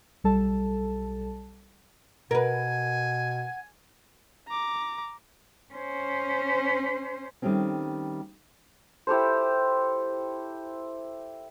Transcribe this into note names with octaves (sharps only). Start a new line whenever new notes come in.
B1 G3 A4 A5
B2 A#4 B4 F#5 G#5
A#5 D6
C#4 C5
D#3 G3 A3 C4 C#4
E4 G4 A4 C5